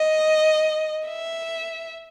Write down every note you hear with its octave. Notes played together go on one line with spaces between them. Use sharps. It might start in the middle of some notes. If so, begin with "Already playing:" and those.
Already playing: D#5
E5